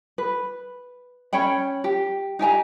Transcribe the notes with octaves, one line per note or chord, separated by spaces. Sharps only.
B4
C#4 C#5 G5 B5
G4
D#4 G4 G#5 A#5